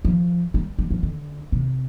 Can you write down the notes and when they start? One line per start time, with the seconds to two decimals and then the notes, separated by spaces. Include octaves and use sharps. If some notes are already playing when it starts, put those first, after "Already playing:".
0.05 F3
0.54 G3
0.79 G3
0.91 F3
1.03 D3
1.52 C3